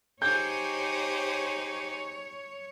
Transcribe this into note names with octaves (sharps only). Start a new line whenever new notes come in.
D#4 G4 G#4 C5 C#5 G6